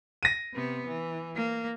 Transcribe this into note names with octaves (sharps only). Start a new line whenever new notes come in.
A#6 D#7
C3 B3
E3
A#3